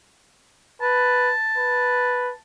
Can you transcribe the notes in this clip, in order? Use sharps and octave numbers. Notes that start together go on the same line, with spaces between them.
B4 A5
B4